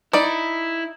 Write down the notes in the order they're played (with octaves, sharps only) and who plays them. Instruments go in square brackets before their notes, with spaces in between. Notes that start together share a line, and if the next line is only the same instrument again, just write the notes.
[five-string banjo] D#4 D5 [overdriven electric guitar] E4